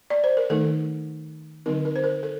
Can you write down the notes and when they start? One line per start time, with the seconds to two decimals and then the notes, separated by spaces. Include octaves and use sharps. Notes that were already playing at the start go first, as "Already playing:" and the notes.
0.10 D5
0.24 C5
0.37 A#4
0.50 D#3 A3 D#4 A4
1.66 D3 F#3 C4 D#4 A#4
1.85 A#4
1.96 C5
2.04 A#4
2.23 A4